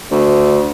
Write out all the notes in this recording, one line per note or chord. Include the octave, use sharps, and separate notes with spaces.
D2